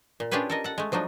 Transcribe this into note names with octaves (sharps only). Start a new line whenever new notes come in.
A#2
C#4 D4 F4 G4 G#4 B4
A4 A#4 D#5
A4 F#5
G#3 A3
F3 F#3 D4 D#4